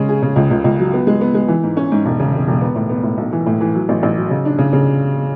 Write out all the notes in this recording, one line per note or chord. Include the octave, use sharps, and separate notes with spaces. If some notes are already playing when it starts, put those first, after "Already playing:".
Already playing: C#3 G#3 C#4
G#4
C#3
C#2
C#2
C#2
F#3
B3
G#3
B3
G#3
E3
G#2
C#4
G#2
E1
C#3
E1
E1
B3
A2
B3
A2
B1
E3
A2
E3
F#3
A1
A1
F#3
C#3
D4
C#3
C#3